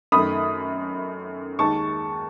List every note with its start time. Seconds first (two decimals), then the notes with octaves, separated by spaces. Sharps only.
0.12 F#2 D#3 A3 B5 D#6
1.59 D#2 D#3 G#3 A5 C#6